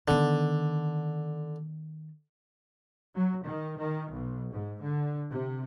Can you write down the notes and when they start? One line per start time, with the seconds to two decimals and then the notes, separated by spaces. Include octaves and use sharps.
0.08 D3 D#3 B3
3.15 F#3
3.45 D#3
3.78 D#3
4.12 B1
4.52 G#2
4.82 D3
5.30 C3